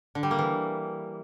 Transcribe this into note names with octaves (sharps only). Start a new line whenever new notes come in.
D3
G3
A#3
E3